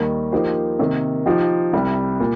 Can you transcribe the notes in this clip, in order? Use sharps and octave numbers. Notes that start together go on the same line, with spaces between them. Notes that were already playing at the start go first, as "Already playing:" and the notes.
Already playing: D#2 D#3 G3 A#3
F3 A#3 D#4 G4 C5
C3 D#3 A#3
F3 D#4 G4
C2 C3 G3
A#2